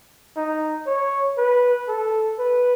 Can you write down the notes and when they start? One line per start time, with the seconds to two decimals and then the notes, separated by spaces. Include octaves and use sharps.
0.37 D#4
0.87 C#5
1.37 B4
1.88 A4
2.39 B4